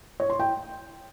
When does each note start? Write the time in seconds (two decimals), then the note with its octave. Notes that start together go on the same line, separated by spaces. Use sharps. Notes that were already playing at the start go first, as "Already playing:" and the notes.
0.20 C#5
0.30 C6
0.40 G5